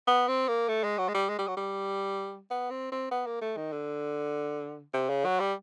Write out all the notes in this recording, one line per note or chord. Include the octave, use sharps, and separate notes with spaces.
B3
C4
A#3
A3
G#3
F#3
G#3
G3
G#3
G3
F#3
G3
B3
C4
C4
B3
A#3
A3
D#3
D3
C3
C#3
F#3
G3